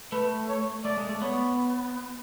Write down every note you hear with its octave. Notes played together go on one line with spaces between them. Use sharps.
A3 B4
C#5
A3 D5
G#3
A3
B3 C#5